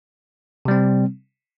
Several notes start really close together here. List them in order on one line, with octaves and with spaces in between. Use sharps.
C3 G3 C4